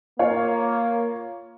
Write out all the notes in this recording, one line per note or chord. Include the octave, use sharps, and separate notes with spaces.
A#3 F4 C#5 F5